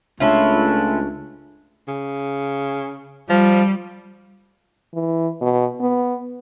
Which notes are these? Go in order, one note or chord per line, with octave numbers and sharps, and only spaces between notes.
C#2 A3 C#4 D4 E4 F4
C#3
F3 G3
E3
B2
B3